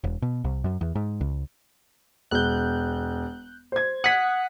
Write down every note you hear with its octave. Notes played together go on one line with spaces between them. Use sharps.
E1
B2
C2
F#2
E2
G#2
C#2
E1 F#6 G6
C5 G#6
F#5 D#6 F#6 G#6 B6